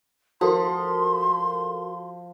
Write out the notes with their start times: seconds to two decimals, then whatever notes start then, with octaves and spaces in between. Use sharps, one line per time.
0.41 F3 F#4 A4 A#4 C6